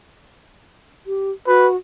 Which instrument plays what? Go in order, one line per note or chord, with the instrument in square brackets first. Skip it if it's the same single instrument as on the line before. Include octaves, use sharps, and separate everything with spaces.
[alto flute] G4
[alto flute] F#4 [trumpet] B4